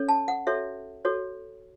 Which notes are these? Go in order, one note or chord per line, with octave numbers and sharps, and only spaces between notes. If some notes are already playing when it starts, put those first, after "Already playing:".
Already playing: C#4 A4 C#5
A5
F#5
F#4 A4 C#5 E5
F#4 A4 C#5